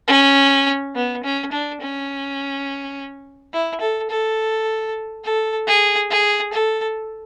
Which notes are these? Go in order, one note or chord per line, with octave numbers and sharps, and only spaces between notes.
C#4
B3
C#4
D4
C#4
E4
A4
A4
A4
G#4
G#4
A4